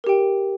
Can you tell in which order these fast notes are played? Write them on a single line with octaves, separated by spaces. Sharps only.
A#4 G4 G5